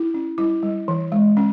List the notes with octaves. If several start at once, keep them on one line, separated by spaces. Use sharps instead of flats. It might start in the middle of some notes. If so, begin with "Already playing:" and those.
Already playing: E4
C#4
G3 E4
G3
E3
G#3
C#4